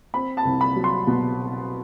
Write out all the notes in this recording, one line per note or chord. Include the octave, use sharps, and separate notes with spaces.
C4 B5
A5
C2
B5
F#3
C6
B2